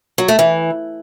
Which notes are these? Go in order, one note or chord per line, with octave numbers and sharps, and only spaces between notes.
F#3
A3
E3